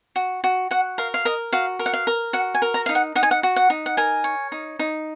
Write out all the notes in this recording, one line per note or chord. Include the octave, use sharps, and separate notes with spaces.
F#4
F#4
F#4 F#5
A#4 F5
F5
A#4 D#5
F#4 F5
A#4
F#5
F5
A#4
F#4 F#5
G#5
A#4
A#5
D#4 F5
F#5
D#4 F#5
G#5
F#5
F#4
F#5
D#4
F#5
A#4 G#5
C#5
D#4
D#4